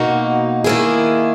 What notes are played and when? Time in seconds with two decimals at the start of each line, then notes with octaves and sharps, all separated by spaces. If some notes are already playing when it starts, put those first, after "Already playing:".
Already playing: B2 A#3 D#4 F#4
0.64 D#3 A#3 E4 G#4